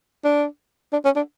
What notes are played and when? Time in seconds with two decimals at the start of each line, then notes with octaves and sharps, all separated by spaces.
0.24 D4
0.92 D4
1.05 C#4
1.16 D4